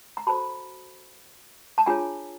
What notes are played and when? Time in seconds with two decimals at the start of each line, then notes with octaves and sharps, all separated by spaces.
0.17 A#5
0.27 F#4 A4 C5 A5 B5
1.78 A5
1.86 D4 F4 G#4 C#5 G#5 A#5